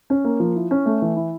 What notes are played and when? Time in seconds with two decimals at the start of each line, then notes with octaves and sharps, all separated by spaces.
0.10 C#4
0.25 A#3
0.40 F3
0.56 E4
0.71 C#4
0.86 A3
1.02 E3
1.16 E4